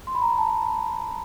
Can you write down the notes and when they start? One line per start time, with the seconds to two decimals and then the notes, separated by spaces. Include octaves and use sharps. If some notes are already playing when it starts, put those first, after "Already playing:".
0.07 C6
0.15 B5
0.22 A#5
0.30 B5
0.38 A5